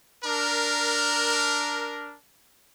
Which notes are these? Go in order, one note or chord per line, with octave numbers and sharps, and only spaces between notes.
D4 A#4